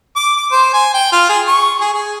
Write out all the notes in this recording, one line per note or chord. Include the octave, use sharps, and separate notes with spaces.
D6
D6
C5
G#5
G5
F4
G#4
C#6
G#4
G#4